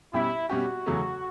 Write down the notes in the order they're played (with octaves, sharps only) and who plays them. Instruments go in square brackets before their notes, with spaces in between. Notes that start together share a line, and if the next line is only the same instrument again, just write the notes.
[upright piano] B2 G3 C#4 G4 [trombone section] E4
[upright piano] B2 G3 C#4 G4 [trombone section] F#4
[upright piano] E2 C#3 F#3 A3 C#4